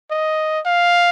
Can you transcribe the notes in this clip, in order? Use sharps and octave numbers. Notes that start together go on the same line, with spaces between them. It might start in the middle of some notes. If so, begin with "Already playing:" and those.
D#5
F5